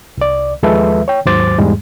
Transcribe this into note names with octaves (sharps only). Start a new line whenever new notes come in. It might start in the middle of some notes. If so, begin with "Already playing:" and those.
C2 D5
D#2 F3 G#3 A4 B4 E5
C#5 G5
D#2 G#2 F#3 C5 D6 A6
E2 G#2 G3 G#3